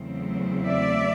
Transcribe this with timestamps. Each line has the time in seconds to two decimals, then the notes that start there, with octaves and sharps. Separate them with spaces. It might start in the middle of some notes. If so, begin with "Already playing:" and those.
Already playing: E2 C#3 F#3 A3 C4
0.65 D5 E5